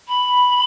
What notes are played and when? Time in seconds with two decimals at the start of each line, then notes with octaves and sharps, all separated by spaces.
0.08 B5